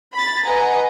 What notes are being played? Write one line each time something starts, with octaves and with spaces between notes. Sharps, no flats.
B5 A6
B4 D#5 F#5 G#5 A#5